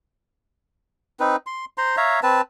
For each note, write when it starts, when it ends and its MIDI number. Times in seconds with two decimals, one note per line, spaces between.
1.20 1.36 60
1.20 1.36 63
1.20 1.36 71
1.47 1.65 84
1.78 1.96 72
1.78 1.96 82
1.78 1.96 84
1.97 2.20 73
1.97 2.20 76
1.97 2.20 77
1.97 2.20 82
2.23 2.41 60
2.23 2.41 71
2.23 2.41 81